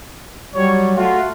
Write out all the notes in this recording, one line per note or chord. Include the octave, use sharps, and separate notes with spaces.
F#3 G3 C#5
A3 F4 F#4